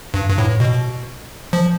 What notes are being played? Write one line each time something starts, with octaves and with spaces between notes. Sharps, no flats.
G2
G2
A2
B2
F3